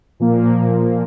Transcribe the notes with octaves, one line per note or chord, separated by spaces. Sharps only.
A#2 F3 A#3